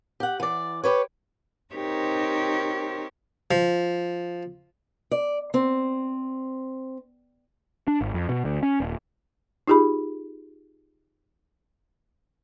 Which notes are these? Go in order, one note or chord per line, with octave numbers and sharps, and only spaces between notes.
G4 F#5
E3 D5
G4 B4 C#5
C4 D#4 G4 A#4 C5 C#5
F3
D5
C4
D4
G#1
F2
B2
D2
C#4
D#1
D#4 F4 G4 G#4 B5